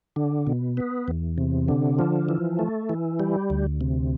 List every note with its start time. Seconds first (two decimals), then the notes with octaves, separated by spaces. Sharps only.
0.16 D3
0.47 B2
0.77 B3
1.08 E2
1.38 C3
1.68 D3
1.99 F3
2.29 E3
2.59 A3
2.89 E3
3.20 G3
3.50 D2
3.81 C3